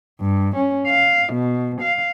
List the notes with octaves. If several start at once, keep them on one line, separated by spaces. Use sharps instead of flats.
G2
C#4
F5
B2
F5